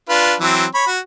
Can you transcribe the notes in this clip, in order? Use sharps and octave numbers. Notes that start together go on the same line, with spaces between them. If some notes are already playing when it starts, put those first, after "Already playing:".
D4 F4 B4
E3 F#3 C4
C#5 B5
F#4